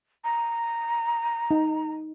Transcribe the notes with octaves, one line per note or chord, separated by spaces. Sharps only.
A#5
D#4